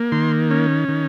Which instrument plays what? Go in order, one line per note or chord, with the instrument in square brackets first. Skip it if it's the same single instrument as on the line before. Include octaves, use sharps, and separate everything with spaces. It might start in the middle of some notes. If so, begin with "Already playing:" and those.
Already playing: [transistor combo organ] A#3
D#3 C6
C#4
D#3